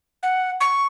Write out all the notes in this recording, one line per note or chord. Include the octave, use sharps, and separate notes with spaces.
F#5
C#6